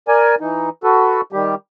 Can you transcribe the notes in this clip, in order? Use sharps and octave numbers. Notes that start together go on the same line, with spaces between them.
A#4 D5 G#5
E3 D#4
F#4 A4 B4
D#3 G3 G4